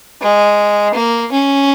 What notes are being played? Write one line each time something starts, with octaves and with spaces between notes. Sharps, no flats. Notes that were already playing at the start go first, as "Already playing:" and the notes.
G#3
A#3
C#4